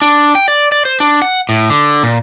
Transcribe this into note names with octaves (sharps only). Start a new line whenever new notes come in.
D4
G5
D5
D5
C5
D4
F#5
A2
D3
A#2